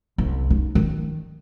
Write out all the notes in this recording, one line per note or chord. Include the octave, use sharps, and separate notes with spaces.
C2
D#4
D#3